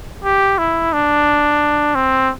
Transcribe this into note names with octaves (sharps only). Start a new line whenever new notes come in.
G4
E4
D4
C4